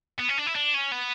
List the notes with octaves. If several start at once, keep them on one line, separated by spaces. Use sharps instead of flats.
B3
C#4
D4
E4
D4
C#4
B3